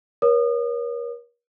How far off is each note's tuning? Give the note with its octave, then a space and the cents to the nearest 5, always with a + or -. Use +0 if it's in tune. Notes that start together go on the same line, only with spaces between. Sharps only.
A#4 +40 C#5 +0 D#6 -35